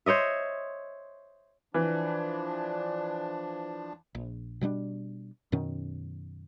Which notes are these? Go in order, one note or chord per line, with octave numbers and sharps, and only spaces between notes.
C5 C#5 D#5 E5
E3 F3 D4
A#1
B2 G3 A#3 D4
F#2 B2 D#3 C#4